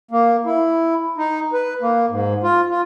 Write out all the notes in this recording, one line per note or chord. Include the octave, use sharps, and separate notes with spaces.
A#3
E4
D#4
B4
A#3
G#2
F4
F4